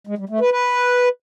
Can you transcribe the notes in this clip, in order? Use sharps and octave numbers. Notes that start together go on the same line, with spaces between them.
G#3
G3
A3
B4
B4